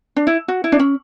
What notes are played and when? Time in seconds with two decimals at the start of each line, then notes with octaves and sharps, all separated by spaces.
0.16 D4
0.27 E4
0.48 F#4
0.64 E4
0.72 D4
0.79 C#4